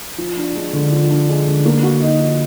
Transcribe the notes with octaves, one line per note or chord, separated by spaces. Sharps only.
F3
D4
G#3
D3
F3
D4
G#3
D3
A#3
F#4
D#4
F3